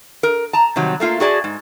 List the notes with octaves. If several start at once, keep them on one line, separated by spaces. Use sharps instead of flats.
A#4
A5 A#5
C3 D#3 F#3 G3
A3 A#3 F4
F#4 G#4 D5 A5
G#2